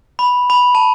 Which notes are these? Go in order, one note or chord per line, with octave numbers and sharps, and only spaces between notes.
B5
B5
A5